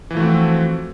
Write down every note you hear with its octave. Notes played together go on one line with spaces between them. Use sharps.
E3 F3 A3 C4 F#4